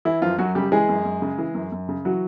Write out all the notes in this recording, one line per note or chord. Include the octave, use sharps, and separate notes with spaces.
E3 E4
F#2 F3 F4
F#2 F#3 F#4
C#3 G3 G4
E3 G#3 G#4
F#2
F#2
C#3
E3
F#2
F#2
C#3
E3 F#3 F#4